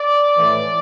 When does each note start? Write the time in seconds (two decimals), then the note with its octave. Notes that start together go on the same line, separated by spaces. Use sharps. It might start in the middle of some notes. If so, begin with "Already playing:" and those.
Already playing: D5
0.37 A2 E3